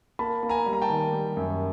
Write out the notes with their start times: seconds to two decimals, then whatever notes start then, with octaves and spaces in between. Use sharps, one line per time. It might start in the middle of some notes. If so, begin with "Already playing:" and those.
0.19 A#3 A5 B5
0.43 A#3
0.49 G#5 A#5
0.66 G3
0.73 A#5
0.82 G5 A5
0.90 D#3
1.12 G3
1.37 F#2